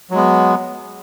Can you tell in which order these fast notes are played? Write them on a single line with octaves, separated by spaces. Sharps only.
F#3 G#3 B3